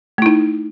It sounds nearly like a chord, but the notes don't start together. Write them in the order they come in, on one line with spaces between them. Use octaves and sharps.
A3 E4 D#4